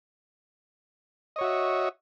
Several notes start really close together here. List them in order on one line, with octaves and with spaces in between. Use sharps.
D#5 C#5 F#4 E5